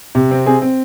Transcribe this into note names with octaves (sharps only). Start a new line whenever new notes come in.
C3
C4
C4 G#4
C4